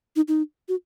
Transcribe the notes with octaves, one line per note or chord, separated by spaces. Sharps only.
D#4
D#4
F#4